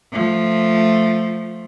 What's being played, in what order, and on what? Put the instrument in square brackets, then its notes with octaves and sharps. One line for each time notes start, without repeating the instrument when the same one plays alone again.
[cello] F3 A3